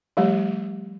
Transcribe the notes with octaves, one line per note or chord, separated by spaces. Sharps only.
F3 G3 A3 G4